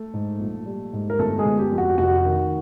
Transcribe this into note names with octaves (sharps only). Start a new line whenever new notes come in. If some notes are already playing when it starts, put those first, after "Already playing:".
Already playing: A3 A4
G#2
A#1
G3
G#2
A#4
G1 A3 A4
G#3 G#4
G1
G4
F2
F#4
F1 F#4
D#3